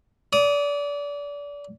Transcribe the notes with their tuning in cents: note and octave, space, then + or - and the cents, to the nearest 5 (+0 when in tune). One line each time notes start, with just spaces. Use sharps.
D5 -30 D#6 +5